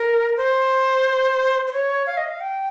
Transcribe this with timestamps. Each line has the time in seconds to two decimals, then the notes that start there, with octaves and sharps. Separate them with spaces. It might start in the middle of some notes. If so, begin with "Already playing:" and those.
Already playing: A#4
0.37 C5
1.67 C5
1.73 C#5
2.07 F5
2.17 D#5
2.28 F5
2.41 G5